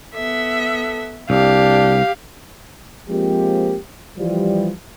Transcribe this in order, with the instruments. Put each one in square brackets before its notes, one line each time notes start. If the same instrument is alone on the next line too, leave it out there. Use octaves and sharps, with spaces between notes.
[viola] B3 E5 [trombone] A4
[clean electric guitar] C2 [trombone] D4 [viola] G4 [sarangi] F5
[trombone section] F3 G#3 A#3 C4 G4
E3 F3 G3